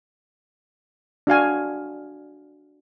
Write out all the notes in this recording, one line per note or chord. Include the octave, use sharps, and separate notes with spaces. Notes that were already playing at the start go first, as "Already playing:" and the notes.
D4 F#4 F5 G#5